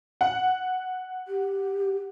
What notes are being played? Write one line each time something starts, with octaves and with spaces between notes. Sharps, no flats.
F#5
G4